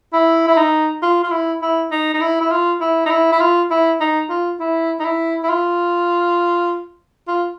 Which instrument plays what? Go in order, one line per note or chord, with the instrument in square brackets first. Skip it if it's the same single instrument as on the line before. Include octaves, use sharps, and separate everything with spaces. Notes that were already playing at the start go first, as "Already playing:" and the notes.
[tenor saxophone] E4
E4
D#4
F4
F4
E4
E4
D#4
D#4
E4
E4
F4
E4
D#4
E4
E4
F4
E4
D#4
F4
E4
D#4
E4
E4
F4
F4